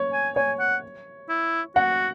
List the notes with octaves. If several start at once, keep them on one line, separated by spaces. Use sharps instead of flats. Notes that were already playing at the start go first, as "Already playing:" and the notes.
Already playing: C#5
G#5
C#5 G#5
F#5
E4
F#4 F#5